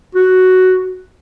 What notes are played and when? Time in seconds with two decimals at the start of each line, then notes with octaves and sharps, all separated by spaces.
0.15 F#4